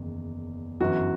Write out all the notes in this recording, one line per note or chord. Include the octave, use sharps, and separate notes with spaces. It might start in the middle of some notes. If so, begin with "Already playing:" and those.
Already playing: F#1 E2 D#3
G1 F#2 E3 F#4